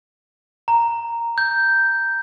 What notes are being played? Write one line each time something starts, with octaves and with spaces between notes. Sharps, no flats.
A#5
G6